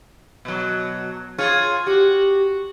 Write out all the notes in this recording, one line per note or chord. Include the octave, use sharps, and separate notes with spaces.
B2 F#3
F4 G#4 C#5
F#4 G4